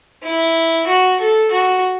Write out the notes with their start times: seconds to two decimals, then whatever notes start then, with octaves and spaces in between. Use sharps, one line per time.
0.23 E4
0.87 F#4
1.20 A4
1.51 F#4